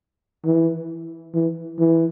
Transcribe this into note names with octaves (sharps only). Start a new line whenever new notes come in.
E3
E3
E3